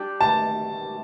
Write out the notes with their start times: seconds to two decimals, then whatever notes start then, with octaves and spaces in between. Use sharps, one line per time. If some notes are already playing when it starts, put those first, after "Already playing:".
Already playing: G3 D4 G4
0.21 A5